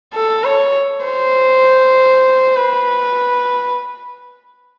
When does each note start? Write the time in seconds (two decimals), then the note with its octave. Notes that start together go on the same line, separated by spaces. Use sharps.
0.14 A4
0.44 C#5
1.05 C5
2.56 B4